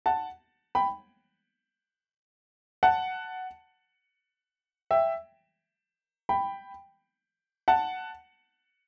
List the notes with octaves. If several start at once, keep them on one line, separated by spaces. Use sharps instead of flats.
F#5 A5
G5 B5
F#5 A5
E5 G5
G5 B5
F#5 A5